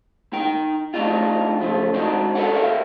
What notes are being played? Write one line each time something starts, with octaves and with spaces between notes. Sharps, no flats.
D#4 G5
A3 C4 D4 D#4 F4
C#3 F3 A3
G#3 C4 D4 D#4 F#4
G4 A4 A#4 C#5 D5 F#5
G4 A#4 E5 F5